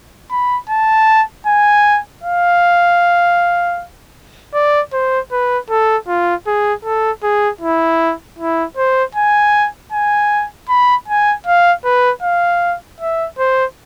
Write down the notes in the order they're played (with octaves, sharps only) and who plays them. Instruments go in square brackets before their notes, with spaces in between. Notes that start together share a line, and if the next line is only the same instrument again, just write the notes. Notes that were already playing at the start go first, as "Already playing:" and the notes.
[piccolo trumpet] B5
A5
G#5
F5
D5
C5
B4
A4
F4
G#4
A4
G#4
E4
E4
C5
G#5
G#5
B5
G#5
F5
B4
F5
E5
C5